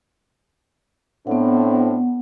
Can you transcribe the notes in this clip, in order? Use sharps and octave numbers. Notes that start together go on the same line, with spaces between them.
A2 B3 C4 D4 F#5